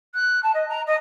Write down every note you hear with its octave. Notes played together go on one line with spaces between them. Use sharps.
F#6
A5
D#5
A#5
D#5